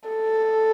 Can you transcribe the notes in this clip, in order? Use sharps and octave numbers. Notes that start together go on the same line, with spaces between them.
A4